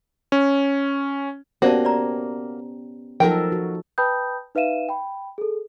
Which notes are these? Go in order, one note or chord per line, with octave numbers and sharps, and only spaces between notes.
C#4
A#3 B3 C#4 F#4 G4 C5 D5 A5
D5 A#5
F3 F#3 D#4 A4 A#4 G5
F#4
B4 G5 A5 B5 D#6 G6
D#4 B4 E5 F5 D#7 E7
G5 B5
G#4 A4